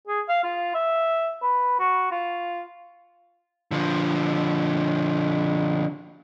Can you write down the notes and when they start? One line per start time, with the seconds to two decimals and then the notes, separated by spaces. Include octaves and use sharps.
0.08 G#4
0.29 F5
0.44 F4
0.75 E5
1.42 B4
1.79 F#4
2.11 F4
3.71 D3 F3